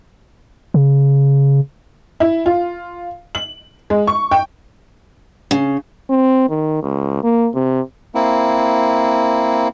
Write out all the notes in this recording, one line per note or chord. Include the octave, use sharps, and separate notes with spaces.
C#3
E4
F4
F#7
G#3
C#6
G5
C#3
C4
D#3
C#2
A#3
C3
A#3 C4 E4